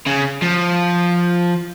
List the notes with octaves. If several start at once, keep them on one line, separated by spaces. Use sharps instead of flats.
C#3
F3